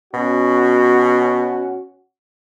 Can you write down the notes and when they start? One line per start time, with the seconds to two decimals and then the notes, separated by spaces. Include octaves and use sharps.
0.14 B2 C#4 F#4